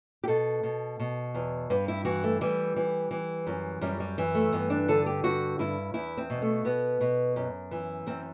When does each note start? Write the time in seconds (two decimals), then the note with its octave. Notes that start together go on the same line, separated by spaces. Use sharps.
0.24 G4
0.28 B2 A4
0.63 B2
1.00 B2
1.34 E2
1.70 G2 B4
1.88 E4
2.05 E3 F#4
2.23 A3
2.41 E3 G3
2.76 E3
3.11 E3
3.47 F#2
3.81 F#2 G3
4.00 G3
4.18 E3
4.35 A3
4.52 G2 B3
4.70 D4
4.88 D3 A4
5.06 G4
5.24 G2 F#4
5.59 G2 E4
5.94 E2 E4
6.17 C4
6.30 B2
6.42 A3
6.65 B2 B3
7.01 B2
7.36 F#2
7.71 E3
8.07 F#2 C4